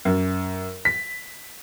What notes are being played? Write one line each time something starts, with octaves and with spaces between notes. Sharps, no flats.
F#2
B6